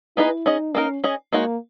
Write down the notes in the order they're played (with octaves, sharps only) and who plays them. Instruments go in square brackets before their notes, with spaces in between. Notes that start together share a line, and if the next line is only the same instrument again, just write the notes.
[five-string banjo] B3 D#4 G#4 B4 D#5 [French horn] E4
[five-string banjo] C#4 G#4 D#5 [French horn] D#4
[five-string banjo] A#3 D#4 A#4 [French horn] C#4
[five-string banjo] C#4 G#4 D#5
[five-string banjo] G#3 D#4 F#4 C#5 [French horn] A#3